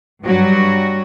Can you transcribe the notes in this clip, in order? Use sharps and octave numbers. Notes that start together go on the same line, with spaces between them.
G2 F#3 G3 F#4